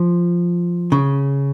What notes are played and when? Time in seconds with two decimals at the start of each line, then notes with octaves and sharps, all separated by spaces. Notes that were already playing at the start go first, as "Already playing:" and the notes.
Already playing: F3
0.92 C#3